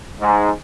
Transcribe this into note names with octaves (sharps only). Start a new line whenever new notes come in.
G#2